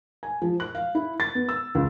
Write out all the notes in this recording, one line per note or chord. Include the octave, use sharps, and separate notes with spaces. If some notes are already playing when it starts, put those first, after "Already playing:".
G#5
F3
F#6
F5
E4
A6
B3
E6
C#2